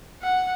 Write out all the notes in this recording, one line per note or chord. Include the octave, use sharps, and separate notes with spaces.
F#5